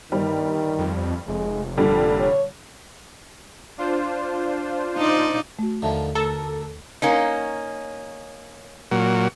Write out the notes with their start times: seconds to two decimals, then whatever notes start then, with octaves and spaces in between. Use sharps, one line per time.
0.12 G1 D#3 G3
0.79 F2
1.27 F1 G#3
1.77 A#2 D3 G3 A4
2.20 C#5
3.78 D4 F4 C5
4.97 D#4 D5
5.59 A3 F#4
5.82 D#2 D3 D#3 F3 E5 A5
6.15 D2 A4 A#4
7.02 A#3 C#4 D#4
8.91 A#2 F#3